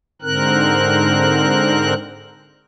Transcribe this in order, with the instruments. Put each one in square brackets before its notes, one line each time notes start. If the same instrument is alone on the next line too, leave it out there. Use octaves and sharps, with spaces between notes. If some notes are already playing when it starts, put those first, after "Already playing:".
[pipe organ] G#2 D3 C4 A#4 F#6